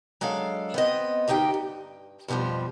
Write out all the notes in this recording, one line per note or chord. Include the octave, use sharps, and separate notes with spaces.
F#3 G#3 D4 A4 F5
B3 C4 D#5
D2 A#3 D#4 G4 G5
G2
F2 B2 D#3 F3 G3